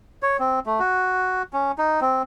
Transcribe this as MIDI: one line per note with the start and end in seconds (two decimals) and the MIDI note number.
0.23 0.37 73
0.39 0.60 60
0.66 0.80 57
0.80 1.42 66
1.53 1.72 61
1.78 2.00 63
2.01 2.22 60